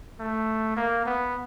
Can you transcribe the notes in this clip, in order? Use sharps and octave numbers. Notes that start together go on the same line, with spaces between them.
A3
A#3
B3